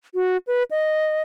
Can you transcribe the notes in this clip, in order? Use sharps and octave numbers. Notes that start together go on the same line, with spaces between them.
F#4
B4
D#5